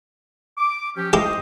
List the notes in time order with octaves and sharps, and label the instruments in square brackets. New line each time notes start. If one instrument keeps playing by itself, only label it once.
[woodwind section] D6
F3 C#4 G4
[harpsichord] E4 G4 [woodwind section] C5 D#5